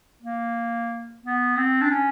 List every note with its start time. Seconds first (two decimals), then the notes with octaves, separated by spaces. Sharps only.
0.22 A#3
1.24 B3
1.57 C4
1.81 D4
1.91 C#4